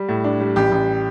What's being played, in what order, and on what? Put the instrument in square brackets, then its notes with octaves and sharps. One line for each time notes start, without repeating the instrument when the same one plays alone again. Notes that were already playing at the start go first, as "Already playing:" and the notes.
Already playing: [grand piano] G3
A2
D4
G3
A1 G4
A1